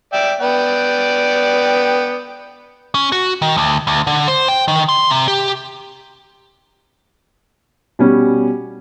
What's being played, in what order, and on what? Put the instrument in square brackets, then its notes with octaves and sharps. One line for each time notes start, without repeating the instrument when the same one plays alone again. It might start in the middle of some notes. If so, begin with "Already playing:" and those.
[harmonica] D5 E5 G5
B3 D5 G5
[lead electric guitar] C#4
F#4
D#3
D2
D2
D3
C5
G5
D#3
C6
C3
G4
[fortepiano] B2 G3 C#4